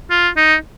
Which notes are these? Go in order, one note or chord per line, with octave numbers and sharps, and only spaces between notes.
F4
D#4